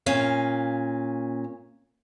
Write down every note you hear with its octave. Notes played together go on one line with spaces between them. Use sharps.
A#2 C#4 F5